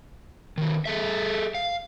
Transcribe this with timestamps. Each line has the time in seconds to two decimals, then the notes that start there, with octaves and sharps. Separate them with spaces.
0.58 D#3 F#3
0.86 G#4 A4 E5
1.55 F5